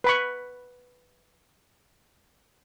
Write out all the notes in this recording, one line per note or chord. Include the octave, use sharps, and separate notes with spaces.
B4 B5 C#6